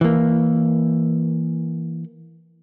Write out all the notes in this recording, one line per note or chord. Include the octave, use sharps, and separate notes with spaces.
E3 A#3